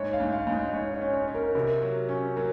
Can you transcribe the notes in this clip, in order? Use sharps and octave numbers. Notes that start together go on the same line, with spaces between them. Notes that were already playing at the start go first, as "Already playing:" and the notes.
Already playing: G#2 C#5
F5
G#2
F5
G#2
D#5
G#2 C#5
C#5
C#4
C#5
C#4
A#4
C3 A#4
F#3
C#4
F#3 A#4